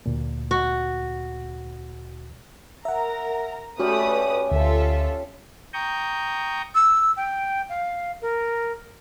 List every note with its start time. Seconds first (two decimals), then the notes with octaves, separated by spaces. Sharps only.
0.06 D2 A#2
0.51 F#4
2.85 A#4 E5 F#5 A#5
3.79 A3 C#4 F#4 G4 B4 D5 D#6
4.52 D2 F4 A4 E5
5.74 G5 A#5 C#6 D#6 G6
6.75 E6
7.17 G5
7.69 F5
8.22 A#4